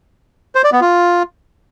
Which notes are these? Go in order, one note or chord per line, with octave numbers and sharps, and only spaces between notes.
C5
D5
B3
F4